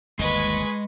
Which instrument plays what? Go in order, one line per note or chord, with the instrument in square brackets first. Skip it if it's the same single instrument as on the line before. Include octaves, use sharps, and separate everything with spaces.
[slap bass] G1 D#2 [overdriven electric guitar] G#3 D#5 [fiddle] B4 C#6